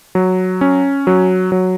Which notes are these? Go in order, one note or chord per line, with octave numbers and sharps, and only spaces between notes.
F#3
C#4
F#3
F#3